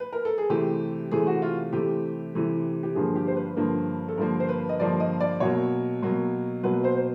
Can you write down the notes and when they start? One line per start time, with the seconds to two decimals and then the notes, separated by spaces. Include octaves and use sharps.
0.00 B4
0.13 A#4
0.25 A4
0.38 G#4
0.50 C3 E3 A3 G4
1.11 C3 E3 A3 G#4
1.27 F#4
1.42 F4
1.73 C3 E3 A3 G4
2.35 C3 E3 A3
2.83 G4
2.95 G2 D3 F3 A#3 G#4
3.16 G4
3.27 C5
3.37 B4
3.57 G2 D3 F3 A#3
4.09 A4
4.18 G2 D3 F3 A#3 A#4
4.40 C5
4.49 B4
4.69 D#5
4.80 G2 D3 F3 A#3 D5
5.00 D#5
5.21 D5
5.40 B2 F#3 A#3 C#5
6.02 B2 F#3 A#3
6.63 B2 F#3 A#3 B4
6.84 C5
6.96 C5